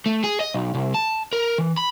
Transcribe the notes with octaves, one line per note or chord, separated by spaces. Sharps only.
A3
G#4
D#5
B1
C2
A5
A#4
E3
B5